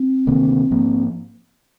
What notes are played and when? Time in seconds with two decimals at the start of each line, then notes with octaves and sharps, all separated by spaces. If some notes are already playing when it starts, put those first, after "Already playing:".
Already playing: C4
0.27 D2 C3 D#3 A#3
0.71 G#2 F3 A#3